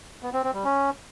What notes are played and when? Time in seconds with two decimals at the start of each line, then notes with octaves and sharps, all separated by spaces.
0.23 B3
0.33 C4
0.43 C4
0.54 G3
0.64 C#4